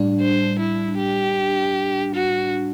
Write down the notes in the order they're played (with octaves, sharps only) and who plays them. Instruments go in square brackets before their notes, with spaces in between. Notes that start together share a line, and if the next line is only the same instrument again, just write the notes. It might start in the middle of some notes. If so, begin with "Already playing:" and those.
Already playing: [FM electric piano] A2 G3 D4
[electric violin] C5
E4
G4
F#4